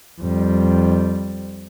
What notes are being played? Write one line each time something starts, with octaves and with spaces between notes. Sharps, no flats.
F2 G3